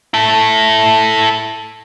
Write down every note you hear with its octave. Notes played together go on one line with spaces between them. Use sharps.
E4 A4